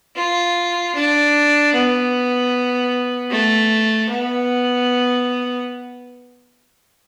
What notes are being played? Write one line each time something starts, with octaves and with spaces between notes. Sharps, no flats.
F4
D4
B3
A3
B3